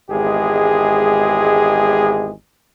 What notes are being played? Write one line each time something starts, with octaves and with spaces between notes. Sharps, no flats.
G#1 E2 G#3 G4 G#4